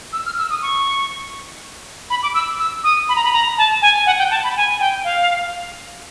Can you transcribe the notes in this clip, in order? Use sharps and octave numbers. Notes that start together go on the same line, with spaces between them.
E6
F6
E6
D#6
C#6
B5
D6
E6
E6
D#6
B5
A#5
B5
A#5
A5
G#5
F#5
G5
A5
B5
G#5
G5
F5